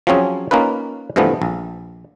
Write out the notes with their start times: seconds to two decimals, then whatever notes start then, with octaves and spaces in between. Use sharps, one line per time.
0.07 F3 F#3 C4 C#4 G#4
0.51 A#3 C#4 D#4 F4 B4
1.16 G2 C3 E3 F3 A3 B3
1.42 A#1